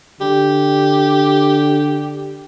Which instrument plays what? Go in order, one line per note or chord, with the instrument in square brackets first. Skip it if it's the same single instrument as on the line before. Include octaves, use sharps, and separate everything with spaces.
[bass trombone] D3 [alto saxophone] G4